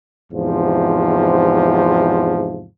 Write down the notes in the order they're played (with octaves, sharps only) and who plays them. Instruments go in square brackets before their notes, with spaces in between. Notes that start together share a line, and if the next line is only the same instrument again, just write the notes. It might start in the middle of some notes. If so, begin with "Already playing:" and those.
[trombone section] E2 G#2 C3 F3